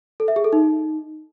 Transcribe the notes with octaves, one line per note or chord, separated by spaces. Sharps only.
A4
E5
G#4
A4
D#4